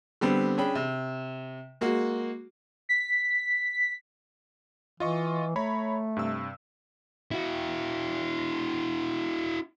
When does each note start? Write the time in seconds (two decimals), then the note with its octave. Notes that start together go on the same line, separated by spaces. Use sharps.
0.21 D3 G3 B3 C4
0.58 C#4 D4 G#4 G5 B5
0.75 C3
1.81 G#3 A#3 F#4
2.89 B6
5.00 E3 F4 D#5 C#6
5.56 A3 C#5 A#5 B5
6.17 G2 C3 E6
7.31 E4 F#4